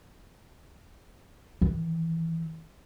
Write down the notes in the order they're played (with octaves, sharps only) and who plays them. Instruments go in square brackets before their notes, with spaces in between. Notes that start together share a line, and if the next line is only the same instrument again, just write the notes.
[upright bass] D#3 E3